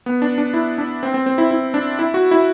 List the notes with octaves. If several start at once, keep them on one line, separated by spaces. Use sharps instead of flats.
B3
D4
D4
E4
D4
C4
C4
C4
E4
E4
D4
E4
F#4
E4